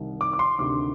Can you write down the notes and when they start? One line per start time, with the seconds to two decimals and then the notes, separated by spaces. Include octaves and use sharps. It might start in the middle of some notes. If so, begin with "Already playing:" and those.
Already playing: C2 C3 D#3
0.21 D6
0.33 D6
0.39 C6
0.59 D2 C3 D#3 D6